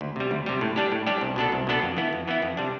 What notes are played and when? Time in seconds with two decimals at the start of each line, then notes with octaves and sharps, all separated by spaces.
0.01 D2
0.16 C3 G3
0.31 D2
0.46 C3 G3
0.61 A2
0.76 G3 D4 G4
0.92 A2
1.07 G3 D4 G4
1.21 C2
1.36 B2 B3 D4 A4
1.52 C2
1.67 B2 B3 D4 A4
1.82 F2
1.97 E3 B3 E4
2.13 F2
2.28 E3 B3 E4
2.42 F2
2.57 C3 G3 D4